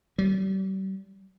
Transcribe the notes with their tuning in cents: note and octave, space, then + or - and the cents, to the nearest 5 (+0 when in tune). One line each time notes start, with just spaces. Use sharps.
G3 -40